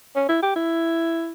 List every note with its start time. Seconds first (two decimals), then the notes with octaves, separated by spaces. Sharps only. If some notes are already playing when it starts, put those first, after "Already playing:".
0.16 C#4
0.29 E4
0.43 G4
0.56 E4